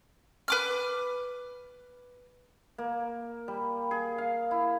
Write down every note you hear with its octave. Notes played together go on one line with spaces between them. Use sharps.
B4 D6 F6
A#3
G3
G#4
F5
E4